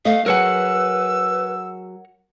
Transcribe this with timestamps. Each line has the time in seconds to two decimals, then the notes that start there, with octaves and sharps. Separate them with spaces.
0.05 A3 D#5 F5
0.26 F#3 G#4 A#4 B4 C#5 F#5 E6